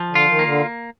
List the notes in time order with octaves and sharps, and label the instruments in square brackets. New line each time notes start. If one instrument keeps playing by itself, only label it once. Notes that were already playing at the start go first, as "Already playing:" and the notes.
Already playing: [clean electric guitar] F3
[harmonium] D3
[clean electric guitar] F4
[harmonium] D#3
[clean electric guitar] A#3
[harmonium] D3